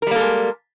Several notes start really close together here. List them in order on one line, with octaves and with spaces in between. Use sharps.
A#4 G3 A#3 A4 G#3